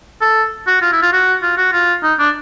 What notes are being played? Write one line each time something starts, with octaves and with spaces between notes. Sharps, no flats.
A4
F#4
F4
E4
F4
F#4
F4
F#4
F4
D#4
D4